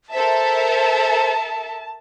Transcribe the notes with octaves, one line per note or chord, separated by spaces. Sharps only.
A4 A#4 C5 E5 A5